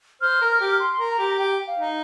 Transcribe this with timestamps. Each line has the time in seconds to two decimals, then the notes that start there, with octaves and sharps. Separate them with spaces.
0.21 C5 F6
0.41 A#4
0.51 F6
0.61 G4
0.80 C6
1.00 A#4
1.10 A#5
1.19 G4
1.38 G4 G5
1.67 F5
1.77 D#4